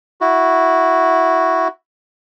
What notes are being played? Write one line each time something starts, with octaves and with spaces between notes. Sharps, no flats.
E4 F#4